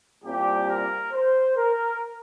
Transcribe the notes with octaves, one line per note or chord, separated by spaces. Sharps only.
C2 A#2 G3 C4 G4
A#4
C5
A#4